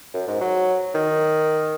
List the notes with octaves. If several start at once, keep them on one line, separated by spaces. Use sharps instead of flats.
F#2
G#2
F#3
D#3